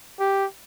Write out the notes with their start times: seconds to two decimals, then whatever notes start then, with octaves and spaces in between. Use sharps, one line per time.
0.20 G4